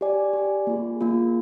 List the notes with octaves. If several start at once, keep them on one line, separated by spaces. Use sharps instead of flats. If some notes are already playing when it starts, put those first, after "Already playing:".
G4 D5 G#5
G4 D5 G#5
A#3 F4 G#4
A#3 F4 G#4